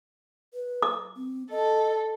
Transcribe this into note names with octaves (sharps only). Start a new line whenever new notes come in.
B4
D6
C4
A4 D#5